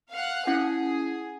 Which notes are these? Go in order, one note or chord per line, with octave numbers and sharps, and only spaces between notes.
F5 F#5
C#4 E4 G#4 F#5